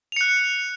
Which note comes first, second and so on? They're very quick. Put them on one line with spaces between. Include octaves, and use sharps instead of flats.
F7 C#7 F#6